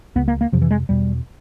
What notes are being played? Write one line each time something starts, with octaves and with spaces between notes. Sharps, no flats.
C#2 C#3 B3
A#3
A#3
F2 C3 F3
E3
G#3
E2 B2 G3